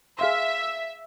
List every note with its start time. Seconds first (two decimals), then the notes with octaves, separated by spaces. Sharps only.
0.19 G#4 E5 F5 C6